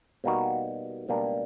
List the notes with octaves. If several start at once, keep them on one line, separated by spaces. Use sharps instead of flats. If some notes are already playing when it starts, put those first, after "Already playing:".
B2 G3 A#3 D#4 F#4
C#2 B2 G3 A#3 D4